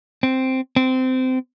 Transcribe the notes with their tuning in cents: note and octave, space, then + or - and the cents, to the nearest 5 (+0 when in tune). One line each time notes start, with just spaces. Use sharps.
C4 +0
C4 -20